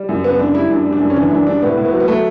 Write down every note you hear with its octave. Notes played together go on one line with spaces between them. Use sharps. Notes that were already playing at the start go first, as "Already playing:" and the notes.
Already playing: G3
F#2
C#3 B3
F#2 D4
G3 E4
F#2 D4
G3
D4
F#2
C#4
E3 D4
F#2 D4
G3 D4
A2 B3
A2
B3
F#3
B3
F#3 A3